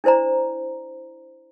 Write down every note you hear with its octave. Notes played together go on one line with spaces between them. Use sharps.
D4 E4 C5 D5 A#5